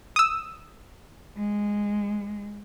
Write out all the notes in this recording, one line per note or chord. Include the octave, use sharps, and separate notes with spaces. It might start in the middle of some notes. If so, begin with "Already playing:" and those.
D#6 E6
G#3